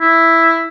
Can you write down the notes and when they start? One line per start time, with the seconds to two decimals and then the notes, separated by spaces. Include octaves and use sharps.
0.01 E4